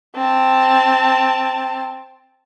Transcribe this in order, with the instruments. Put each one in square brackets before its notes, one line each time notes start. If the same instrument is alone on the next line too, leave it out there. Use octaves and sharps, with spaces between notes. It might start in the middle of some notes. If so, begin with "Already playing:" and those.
[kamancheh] C4 A5